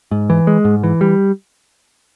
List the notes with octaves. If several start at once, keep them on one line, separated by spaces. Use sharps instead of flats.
G#2
E3
G#3
G#2
E3
G3